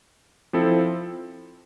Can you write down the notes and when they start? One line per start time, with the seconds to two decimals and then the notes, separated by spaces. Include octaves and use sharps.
0.53 F3 C4 E4 A4